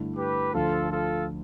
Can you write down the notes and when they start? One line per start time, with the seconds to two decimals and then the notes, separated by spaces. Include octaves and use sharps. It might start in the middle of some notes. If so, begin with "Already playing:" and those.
Already playing: G2 D3 A3 E4
0.16 G4 B4
0.54 D2 D3 F3 F4 A4
0.91 F4 A4